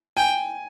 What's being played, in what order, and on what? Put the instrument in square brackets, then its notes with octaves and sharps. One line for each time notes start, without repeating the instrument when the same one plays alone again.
[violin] G5 [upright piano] G#5